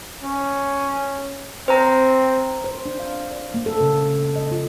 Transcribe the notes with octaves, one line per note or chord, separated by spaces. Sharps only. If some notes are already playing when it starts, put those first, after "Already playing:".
C#4
C4 C5 A#5
C5
D4
F5
D5
A#3
A4
C#3
D#5
F4